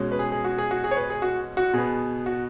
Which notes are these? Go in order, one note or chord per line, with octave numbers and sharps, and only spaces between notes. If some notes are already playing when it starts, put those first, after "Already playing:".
Already playing: B2 G#3 C#4
B4
G#4
G#4
F#4
G#4
F#4
G#4
C#5
B4
G#4
F#4
F#4
B2 B3 G#4
F#4